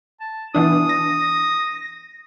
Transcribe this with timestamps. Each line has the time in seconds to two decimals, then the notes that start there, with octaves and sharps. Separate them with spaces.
0.20 A5
0.55 B2 E3 D4 D#6
0.89 A#6